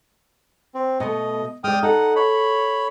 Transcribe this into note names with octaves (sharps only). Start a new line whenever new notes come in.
C4
B2 A3 D#5
G#3 D5 G5 D#6 F6
D#4 A4 F#5
C#5 B5